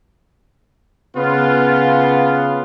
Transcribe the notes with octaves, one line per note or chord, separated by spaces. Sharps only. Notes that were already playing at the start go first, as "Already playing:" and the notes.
C#3 B3 F4